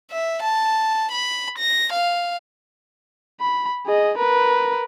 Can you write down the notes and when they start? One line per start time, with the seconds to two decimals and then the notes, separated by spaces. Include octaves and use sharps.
0.11 E5
0.43 A5
1.12 B5
1.58 A#6
1.93 F5
3.40 B5
3.86 G#4 D#5
4.18 A#4 B4